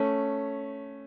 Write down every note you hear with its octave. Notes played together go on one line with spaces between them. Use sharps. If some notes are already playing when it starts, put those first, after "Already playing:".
Already playing: A3 C#4